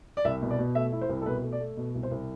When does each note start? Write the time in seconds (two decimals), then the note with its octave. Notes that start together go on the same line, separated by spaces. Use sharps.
0.17 D5
0.24 C2 E5
0.42 B2
0.50 D5
0.59 B2
0.75 A3 E5
0.92 E4
1.01 C5
1.09 C2
1.21 A4
1.26 B2 B4
1.43 A3
1.52 D5
1.60 A3
1.77 B2
1.95 C2
2.03 C5
2.11 C2